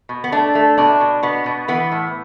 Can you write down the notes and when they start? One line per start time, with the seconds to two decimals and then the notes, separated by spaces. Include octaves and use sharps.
0.09 B2
0.24 B3
0.32 A3 D4
0.55 A3
0.78 B2 D4
1.00 B2
1.23 B2 B3
1.46 B2
1.68 E3 B3
1.92 A2